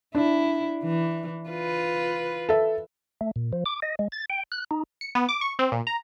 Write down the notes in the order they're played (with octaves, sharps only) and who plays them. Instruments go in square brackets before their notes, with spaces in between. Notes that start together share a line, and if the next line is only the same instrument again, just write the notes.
[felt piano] D4 [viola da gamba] E4
[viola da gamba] E3
F4 B4
[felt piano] A4 E5
[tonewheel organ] A3
A#2
F3
D6
D#5
G#3
A6
G5
F#6
D#4
[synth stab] C#7
B3
D6
C#6
C4
A#2
A#5